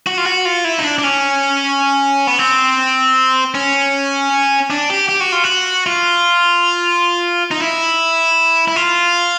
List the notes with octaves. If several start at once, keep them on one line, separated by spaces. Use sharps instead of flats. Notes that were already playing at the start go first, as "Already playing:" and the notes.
F#4
F4
F#4
F4
E4
D#4
D4
D4
C#4
B3
C4
C#4
D4
G4
G4
F#4
F4
F#4
F4
D#4
E4
E4
F4